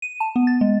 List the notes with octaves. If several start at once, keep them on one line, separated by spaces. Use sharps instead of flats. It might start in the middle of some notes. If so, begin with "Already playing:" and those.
D#7
A5
B3
A6
G#3